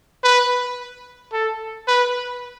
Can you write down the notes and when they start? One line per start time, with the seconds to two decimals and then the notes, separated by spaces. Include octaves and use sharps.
0.23 B4
1.32 A4
1.87 B4